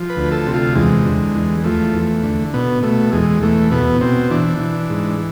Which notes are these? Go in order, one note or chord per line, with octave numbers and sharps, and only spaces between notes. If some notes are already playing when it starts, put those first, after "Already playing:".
Already playing: F3
B4
D2
A4
C3
F4
E2 G#3
D3
E2
F3 A3
E2
D3
B2 B3
B2 A3
E2 G#3
E2 A3
B2 B3
B2 C4
E3 D4
E3
G#2